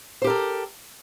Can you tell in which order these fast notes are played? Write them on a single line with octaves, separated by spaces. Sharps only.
C5 G4 A#4 A4